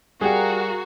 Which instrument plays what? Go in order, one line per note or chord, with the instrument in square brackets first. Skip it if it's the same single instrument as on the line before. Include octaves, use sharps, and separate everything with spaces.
[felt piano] G3 G5 [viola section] F#4 [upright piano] G#4 [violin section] A#4 F5 A#5